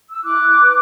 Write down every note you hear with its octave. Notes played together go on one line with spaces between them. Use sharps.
E6
E4 D6 F#6
B4